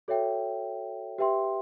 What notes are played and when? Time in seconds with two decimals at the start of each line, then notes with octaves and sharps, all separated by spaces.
0.08 F#4 A4 C#5 E5 G5
1.18 G4 B4 E5 G5 C6